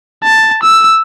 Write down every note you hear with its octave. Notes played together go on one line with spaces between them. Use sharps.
A5
E6